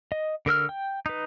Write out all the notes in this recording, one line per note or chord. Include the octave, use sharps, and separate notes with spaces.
D#5
D3 A#4 E6 F6
G5
D#4 B4